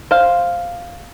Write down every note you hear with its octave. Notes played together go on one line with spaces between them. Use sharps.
C5 F5